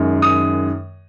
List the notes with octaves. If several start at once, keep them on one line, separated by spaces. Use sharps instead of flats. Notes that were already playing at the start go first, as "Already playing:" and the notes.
Already playing: F#2 D#3 G#3
D#6